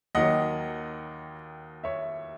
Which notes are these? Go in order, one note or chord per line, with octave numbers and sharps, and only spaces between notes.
D#2 D#3 F#3 D#5 F#5
C#5 E5